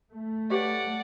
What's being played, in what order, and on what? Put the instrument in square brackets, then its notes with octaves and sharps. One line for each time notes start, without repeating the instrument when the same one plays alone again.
[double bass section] A3
[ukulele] G4 B4 C#5 [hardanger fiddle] D5 F#5